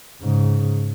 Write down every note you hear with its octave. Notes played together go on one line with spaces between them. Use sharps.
G#2 C#3